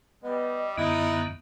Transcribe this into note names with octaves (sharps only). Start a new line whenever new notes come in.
G3 B3 D#5
F#2 D3 B3 D#4 E4